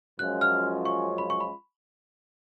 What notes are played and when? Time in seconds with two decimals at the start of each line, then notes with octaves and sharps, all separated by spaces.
0.19 F#2 F3 G#3 C#4 F4 F#6
0.41 F6
0.85 C#6
1.18 B5
1.30 C#6
1.40 B5